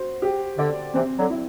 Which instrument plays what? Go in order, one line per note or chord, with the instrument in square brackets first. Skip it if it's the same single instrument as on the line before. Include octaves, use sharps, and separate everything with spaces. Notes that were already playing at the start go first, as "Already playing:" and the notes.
Already playing: [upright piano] F#4 C5
G4
[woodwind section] D3 [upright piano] D5
[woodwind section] C3 E3 [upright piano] C4
[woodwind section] D3 F#3
[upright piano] E4